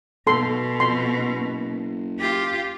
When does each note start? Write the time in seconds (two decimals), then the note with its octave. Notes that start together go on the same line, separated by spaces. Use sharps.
0.27 B1 B2 A4 C6
0.80 F2 C6
1.18 F#1
2.19 F4 G4